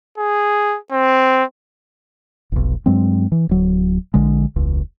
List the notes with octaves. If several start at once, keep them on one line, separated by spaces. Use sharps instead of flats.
G#4
C4
F1 B1
G2 F#3 G#3 C4
E3
D1 F#3
A#1 D3 G#3
E1 C#2